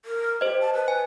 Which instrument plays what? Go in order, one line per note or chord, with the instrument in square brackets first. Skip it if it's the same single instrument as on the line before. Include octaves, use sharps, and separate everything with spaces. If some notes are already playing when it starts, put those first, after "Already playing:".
[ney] A#4
[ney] G4 [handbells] C5 D#5
[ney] A5
B4
[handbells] G#5